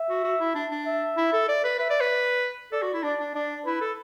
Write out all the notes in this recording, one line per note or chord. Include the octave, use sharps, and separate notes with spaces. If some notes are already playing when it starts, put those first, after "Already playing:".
Already playing: E5
F#4
F#4
E4
D4
D4
E5
E4
A4
D5
B4
B4 E5
D5
B4
D5
A4 D5
F#4
E4
D4 D5
D4
D4 D5
E4 B4
A4